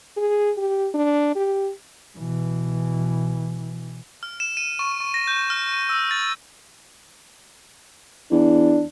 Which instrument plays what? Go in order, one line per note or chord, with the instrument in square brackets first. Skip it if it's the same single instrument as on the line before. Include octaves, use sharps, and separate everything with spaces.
[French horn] G#4
G4
D4
G4
[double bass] B2 E3
[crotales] F6
E7
D#7
C#6
C#6
A#6
G6
F6
D#7
E6
A6
[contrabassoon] E2 [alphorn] D4